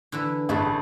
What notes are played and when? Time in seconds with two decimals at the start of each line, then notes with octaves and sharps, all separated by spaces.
0.12 D3 E3 B4
0.49 A1 D4 G#4 B4 A6